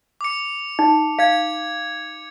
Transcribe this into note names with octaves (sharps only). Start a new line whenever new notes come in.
D6 C#7
D#4
F5 G#6 C#7